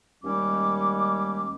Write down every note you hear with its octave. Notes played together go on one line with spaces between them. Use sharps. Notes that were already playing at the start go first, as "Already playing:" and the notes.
D#2 G3 G#3 C#4 D6